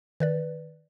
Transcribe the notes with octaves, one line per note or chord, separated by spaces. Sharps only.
D#3 B4 D5